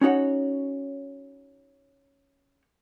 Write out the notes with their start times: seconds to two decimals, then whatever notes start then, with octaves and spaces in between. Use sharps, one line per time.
0.01 C#4 D#4 F#4 C#5 F#5